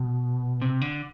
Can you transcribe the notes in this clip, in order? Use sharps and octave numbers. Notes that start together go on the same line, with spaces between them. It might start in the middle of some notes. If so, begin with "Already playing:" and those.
Already playing: B2
C3
D3